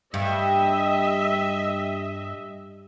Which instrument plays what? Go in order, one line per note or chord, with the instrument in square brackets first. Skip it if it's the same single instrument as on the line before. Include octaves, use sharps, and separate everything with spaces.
[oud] G2 [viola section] D#5 E5